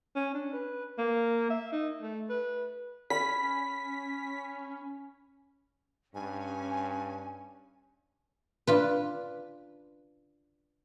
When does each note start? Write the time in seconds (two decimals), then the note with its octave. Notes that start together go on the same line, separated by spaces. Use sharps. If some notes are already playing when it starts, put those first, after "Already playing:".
0.16 C#4
0.34 D4
0.53 B4
0.98 A#3
1.50 E5
1.72 D#4
2.02 A3
2.29 B4
3.10 C#4 B5 B6
6.15 G2 C#4 G#5
8.67 D4 F4 B4